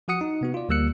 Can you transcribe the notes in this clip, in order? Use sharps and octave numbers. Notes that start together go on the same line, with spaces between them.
F3 F#4 F#5 D#6 C#7
D#4
C3 B3 F#4
F4 D5
D2 G3 A#3 E6 F#6 C#7